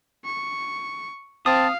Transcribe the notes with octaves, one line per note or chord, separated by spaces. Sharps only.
C#6
C4 F5 A5 D#6